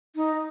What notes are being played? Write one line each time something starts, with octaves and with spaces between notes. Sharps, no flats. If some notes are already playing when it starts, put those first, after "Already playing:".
D#4